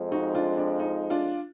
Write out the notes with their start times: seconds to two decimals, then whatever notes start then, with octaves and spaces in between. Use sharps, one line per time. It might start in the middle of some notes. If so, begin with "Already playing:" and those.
Already playing: F2 F3 G#3
0.12 D#4 F#4
0.35 D4 F4
0.57 D4
0.79 D#4
1.10 D4 F4